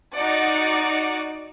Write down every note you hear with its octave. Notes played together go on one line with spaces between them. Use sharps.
D#4 F#4 D5 F#5